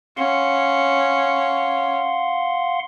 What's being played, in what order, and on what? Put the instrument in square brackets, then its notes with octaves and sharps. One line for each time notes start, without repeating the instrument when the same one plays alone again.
[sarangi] C#4 [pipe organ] F5 F#5 C6